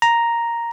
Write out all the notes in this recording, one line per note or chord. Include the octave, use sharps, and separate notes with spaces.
A#5